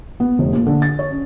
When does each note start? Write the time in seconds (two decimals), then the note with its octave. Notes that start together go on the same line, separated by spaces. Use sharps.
0.20 B3
0.39 F1
0.53 A#2
0.67 D3
0.82 A6
0.99 C#5
1.11 C#4